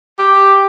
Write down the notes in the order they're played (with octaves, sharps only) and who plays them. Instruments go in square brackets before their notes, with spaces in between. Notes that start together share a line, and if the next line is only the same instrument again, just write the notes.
[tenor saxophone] G4